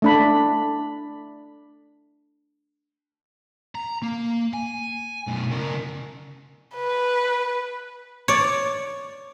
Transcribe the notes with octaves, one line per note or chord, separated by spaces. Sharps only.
A3 D4 B5
A#5
A#3
G#5
F#2 B2
C#3 A#4
B4
C#5 D5